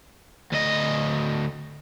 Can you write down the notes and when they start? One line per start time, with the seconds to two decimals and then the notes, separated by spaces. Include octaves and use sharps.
0.53 D2 D#5